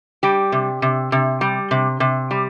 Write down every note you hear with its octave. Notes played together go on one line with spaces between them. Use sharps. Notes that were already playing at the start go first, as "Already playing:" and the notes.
G3 G4
C3
C3
C3
G3
C3
C3
G3